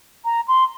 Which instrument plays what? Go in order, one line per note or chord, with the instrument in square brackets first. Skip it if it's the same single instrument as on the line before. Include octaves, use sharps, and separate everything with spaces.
[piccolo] A#5
C6